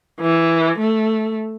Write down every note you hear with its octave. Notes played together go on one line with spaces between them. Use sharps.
E3
A3